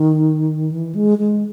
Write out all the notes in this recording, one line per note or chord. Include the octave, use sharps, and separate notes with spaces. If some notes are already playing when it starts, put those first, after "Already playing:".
Already playing: D#3
E3
G#3
G#3